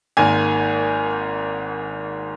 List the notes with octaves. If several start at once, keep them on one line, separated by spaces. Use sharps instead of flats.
G#1 G#2 D#3 A#3 G#5